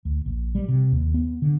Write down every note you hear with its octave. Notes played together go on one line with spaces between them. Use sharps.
D2
A#1
G3
C3
D#2
B3
D3